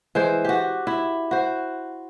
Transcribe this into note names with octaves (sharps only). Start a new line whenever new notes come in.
E3 G#3 C5
F#4 G4
E4
F#4 C5